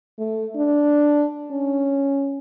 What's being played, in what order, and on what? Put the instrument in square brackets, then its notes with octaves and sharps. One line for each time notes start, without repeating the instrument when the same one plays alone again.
[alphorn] A3
D4
C#4